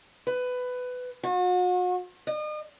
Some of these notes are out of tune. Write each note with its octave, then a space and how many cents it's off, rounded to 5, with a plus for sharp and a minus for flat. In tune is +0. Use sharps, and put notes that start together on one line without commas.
B4 +15
F#4 -40
D#5 -40